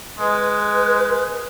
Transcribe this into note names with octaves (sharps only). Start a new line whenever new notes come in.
G#3 B4